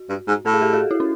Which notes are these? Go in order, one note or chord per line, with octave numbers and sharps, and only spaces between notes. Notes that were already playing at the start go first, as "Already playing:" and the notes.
Already playing: F#4
G2
G#2
A2 A4
G#4
G4 A4
F#4 G#4
E4
C#4